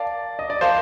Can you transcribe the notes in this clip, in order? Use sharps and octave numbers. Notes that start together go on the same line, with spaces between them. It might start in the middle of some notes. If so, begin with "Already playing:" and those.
Already playing: A#4 D5 F5 A5
D#5
D5
A#4 C5 F5 A5